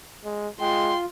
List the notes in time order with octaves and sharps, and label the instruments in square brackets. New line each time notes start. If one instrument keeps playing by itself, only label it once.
[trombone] G#3
[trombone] G#3 [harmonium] F4 [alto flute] G5 [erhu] C6